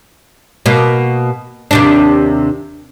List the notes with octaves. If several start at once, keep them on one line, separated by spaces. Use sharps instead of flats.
B2 A#3
D#2 C3 D4